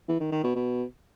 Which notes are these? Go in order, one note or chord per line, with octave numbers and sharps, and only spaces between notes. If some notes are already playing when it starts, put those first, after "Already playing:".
E3
D#3
D#3
B2
B2